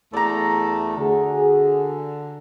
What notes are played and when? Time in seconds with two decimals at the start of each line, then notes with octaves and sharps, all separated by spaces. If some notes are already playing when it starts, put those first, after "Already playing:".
0.14 E2 A3 D5 A#5
0.97 D3 F#4 G#4